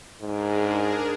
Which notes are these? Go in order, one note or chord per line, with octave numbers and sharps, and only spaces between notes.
G#2 D4 G#4 A#4